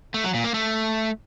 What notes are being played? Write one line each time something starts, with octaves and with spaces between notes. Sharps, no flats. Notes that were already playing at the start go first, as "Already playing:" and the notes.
A3
F#3
A#2
A#3
A3